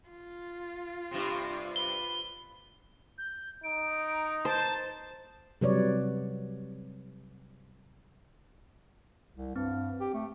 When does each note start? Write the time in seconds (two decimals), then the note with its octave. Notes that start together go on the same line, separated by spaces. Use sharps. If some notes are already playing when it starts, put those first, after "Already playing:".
0.11 F4
1.11 G2 C3 C4
1.76 B4 G7
3.18 G6
3.64 D#4 D7
4.45 C5 A5
5.61 C3 F#3 G3 B4 C#5 D5
9.36 C2
9.56 G2 C4
10.00 G4
10.14 A3